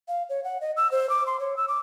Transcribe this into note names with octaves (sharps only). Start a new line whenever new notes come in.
F5
C#5
F#5
D#5
E6
C5
D6
C6
C#5
E6
D6